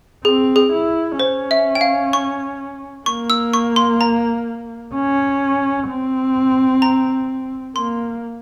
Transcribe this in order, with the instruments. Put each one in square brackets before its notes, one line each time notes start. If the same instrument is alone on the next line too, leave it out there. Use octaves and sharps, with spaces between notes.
[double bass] C4 [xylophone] G#4
[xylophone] G#4
[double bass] E4
[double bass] C#4 [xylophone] C5
[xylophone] E5
G5
F5
C#6
[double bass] A#3 [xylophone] C#6
[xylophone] E6
C#6
C6
A#5
[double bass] C#4
C4
[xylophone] A#5
[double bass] A#3 [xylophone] C6